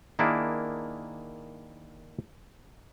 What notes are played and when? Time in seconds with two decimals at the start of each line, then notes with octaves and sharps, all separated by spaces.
0.19 D#3 A#3 D4 E4 G#4